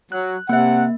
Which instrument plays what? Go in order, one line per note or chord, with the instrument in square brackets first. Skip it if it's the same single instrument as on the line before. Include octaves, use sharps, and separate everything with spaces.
[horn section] F#3 [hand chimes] F#6
[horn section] C3 F#5 [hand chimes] A#3 E5